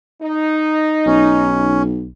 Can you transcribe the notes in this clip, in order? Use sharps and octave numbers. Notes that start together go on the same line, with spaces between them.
D#4
B1 C#4